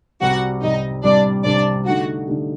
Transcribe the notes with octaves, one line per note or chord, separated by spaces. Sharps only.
C2 C3 G3 F#4 F#5
C2 C3 G3 D#4 D#5
C2 C3 G3 D4 D5
C2 C3 G3 D4 D5
D3 A3 D#4 F#4 G4 F#5
D3 A3 D#4 G4